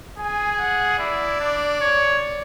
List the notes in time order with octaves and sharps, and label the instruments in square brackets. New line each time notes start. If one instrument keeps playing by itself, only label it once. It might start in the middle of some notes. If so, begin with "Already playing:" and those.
[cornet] G#4 [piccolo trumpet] G#5
[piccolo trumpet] F#5
[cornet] E4 [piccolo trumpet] D5
[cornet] D4
C#5